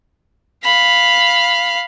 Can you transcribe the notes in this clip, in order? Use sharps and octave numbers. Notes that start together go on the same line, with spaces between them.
F5 B5